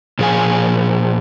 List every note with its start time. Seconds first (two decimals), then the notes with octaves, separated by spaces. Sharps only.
0.19 A#2 F3 G#4 F5 G#5